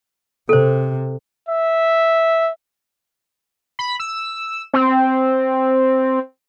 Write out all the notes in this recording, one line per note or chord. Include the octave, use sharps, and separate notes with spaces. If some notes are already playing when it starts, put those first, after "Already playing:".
C3 A4 C5
E5
B5
E6
C4